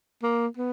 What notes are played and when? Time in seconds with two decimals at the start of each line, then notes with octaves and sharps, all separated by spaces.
0.23 A#3
0.57 B3